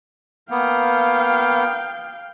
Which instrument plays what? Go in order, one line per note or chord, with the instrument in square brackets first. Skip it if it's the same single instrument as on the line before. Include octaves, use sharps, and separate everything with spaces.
[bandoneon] A#3 B3 [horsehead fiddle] F5 G5